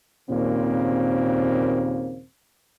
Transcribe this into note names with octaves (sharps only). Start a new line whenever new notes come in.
D#2 A#2 C#3 A#3 C4